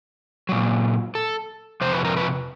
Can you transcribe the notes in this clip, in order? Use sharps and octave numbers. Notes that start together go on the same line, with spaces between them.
A#2 F#3
A4
F2 C3 C5
B4
A#4
B4